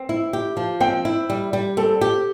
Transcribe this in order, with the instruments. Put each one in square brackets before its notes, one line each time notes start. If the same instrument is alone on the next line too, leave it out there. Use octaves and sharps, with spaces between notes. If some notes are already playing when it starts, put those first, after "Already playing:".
Already playing: [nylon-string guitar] C4
E4
G4
F3
[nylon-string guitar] C4 [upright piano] G5
[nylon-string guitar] E4
G3
G3
[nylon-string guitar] C4 [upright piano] A4
[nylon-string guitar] G4